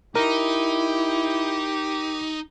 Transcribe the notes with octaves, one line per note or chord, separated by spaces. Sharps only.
D#4 E4 G4 A#4